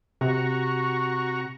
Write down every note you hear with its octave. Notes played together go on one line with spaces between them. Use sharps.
C3 F#4 A#5 C#6